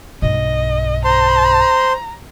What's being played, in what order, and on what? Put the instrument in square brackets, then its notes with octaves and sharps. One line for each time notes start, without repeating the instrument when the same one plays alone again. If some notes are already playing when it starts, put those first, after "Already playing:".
[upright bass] B1 G2 [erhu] D#5
[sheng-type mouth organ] C5 C6 [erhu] A#5